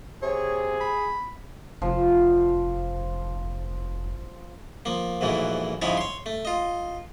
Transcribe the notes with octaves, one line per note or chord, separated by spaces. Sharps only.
C3 G#4 C#5
B5
F1 F3
F3 A#3
A#1 G#2 E3 F#3 A3
G#2 C#3 F3 G#3 E4 C#5
C#5 C6
A3
F4 D#5